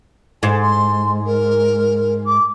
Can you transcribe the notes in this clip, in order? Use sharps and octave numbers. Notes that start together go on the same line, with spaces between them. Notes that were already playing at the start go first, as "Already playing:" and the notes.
G#2 G#5
C6
A#4
D6